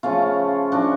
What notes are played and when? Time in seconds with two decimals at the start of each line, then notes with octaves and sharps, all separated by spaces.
0.03 C#3 F3 A3 C#4 F4
0.72 C#3 F3 A3 D4 F#4